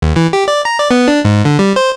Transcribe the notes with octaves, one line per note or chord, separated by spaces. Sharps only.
D#2
E3
G4
D5
A#5
D5
B3
D4
G#2
D3
G3
C5